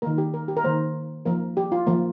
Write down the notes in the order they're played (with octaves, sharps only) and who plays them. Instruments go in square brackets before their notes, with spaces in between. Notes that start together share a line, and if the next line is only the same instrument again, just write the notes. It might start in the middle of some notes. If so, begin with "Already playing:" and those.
[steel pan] D#3 A#3 A#4
G4
A#4
G4
A#4
D#3 A#3 C5
F3 A#3 A#4
G4
F4
F3 A#3